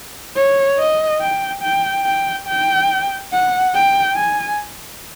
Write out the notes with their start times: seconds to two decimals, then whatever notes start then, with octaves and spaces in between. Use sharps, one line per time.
0.36 C#5
0.79 D#5
1.22 G5
1.63 G5
2.06 G5
2.47 G5
3.32 F#5
3.74 G5
4.16 G#5